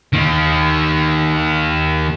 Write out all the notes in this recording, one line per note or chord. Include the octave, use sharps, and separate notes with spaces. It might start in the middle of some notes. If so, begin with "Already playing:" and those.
D#3 A#3